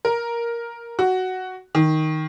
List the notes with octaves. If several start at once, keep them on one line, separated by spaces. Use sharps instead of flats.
A#4
F#4
D#3